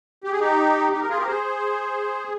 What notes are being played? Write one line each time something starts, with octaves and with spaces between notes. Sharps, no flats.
G4
G#4
D#4 G4
D#4 G4
A#4
F4 G#4
G4 A#4
G#4 C5